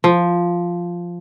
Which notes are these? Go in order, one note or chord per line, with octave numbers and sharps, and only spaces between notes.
F3